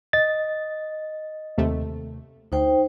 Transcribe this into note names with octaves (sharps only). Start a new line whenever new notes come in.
D#5 A6
D#2 C3 A3
D2 D#4 C5 G5